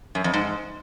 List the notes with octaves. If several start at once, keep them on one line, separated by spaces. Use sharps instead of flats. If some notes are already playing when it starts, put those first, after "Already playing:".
F#2
F2
G#2